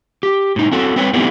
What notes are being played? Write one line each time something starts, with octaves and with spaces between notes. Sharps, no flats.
G4
A2 D#4
C4 F#4 A4
C4 B4 C#5
A3 B3 C4 D4 E4 G4